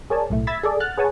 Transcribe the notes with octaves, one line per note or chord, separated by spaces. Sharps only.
G#4 A#4 C#5 D5 G#5 A5
B1 A2 A3
E5 B5 E6 G#6 A6 B6
G#4 A4 D5
F#5 F6 F#6 A6
G#4 B4 C#5 F#5 G#5 A5